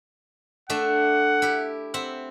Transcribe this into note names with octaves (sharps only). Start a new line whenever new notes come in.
A3 D4 E5 F#5
E4 G4
C4 E5 F#5